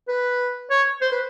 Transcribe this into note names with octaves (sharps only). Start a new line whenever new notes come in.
B4
C#5
C5
B4